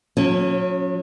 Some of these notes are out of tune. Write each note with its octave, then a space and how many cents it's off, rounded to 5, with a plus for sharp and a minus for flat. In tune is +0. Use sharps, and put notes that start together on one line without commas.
F#3 -35 C#4 +0